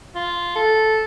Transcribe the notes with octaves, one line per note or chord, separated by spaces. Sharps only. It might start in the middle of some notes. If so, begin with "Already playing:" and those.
F4
A4